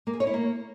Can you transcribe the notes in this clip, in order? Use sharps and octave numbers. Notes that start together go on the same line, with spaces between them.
A#3
G#4
C#5
E4
A#3